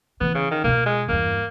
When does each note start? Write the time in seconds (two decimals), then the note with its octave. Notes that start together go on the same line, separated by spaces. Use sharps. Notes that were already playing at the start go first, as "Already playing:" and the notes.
0.21 D3 E3 B3
0.35 C#3
0.51 D#3
0.64 B2 A#3 F4
0.86 G#3
1.09 E2 G2 A#3